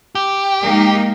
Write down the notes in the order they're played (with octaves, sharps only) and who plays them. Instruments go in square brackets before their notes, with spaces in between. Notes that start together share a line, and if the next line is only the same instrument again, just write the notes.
[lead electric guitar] G4
[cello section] G#3 A#3 D#4